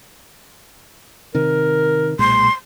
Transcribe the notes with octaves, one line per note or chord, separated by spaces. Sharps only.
C3 D#3 A#4
B1 A#2 G#3 C6